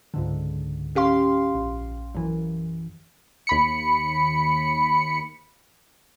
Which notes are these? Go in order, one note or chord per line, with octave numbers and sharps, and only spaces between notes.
C#2 G#2 D3
C#4 G4 F5 C6
A#1
F#2 E3
D#2 B5 C#7